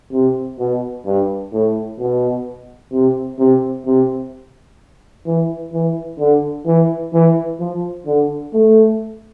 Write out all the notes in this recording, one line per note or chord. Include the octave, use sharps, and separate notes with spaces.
C3
B2
G2
A2
B2
C3
C3
C3
E3
E3
D3
E3
E3
F3
D3
A3